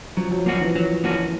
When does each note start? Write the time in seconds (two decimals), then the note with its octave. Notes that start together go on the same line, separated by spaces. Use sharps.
0.17 F3 F#3
0.31 F#3
0.46 F3 A#3 C#4 F#4
0.61 E3
0.75 E3 F#3
1.04 E3 A#3 C#4 F#4